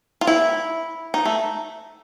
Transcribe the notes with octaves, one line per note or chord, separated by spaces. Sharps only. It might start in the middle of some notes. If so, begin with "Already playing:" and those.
F4
E4
D#4
A3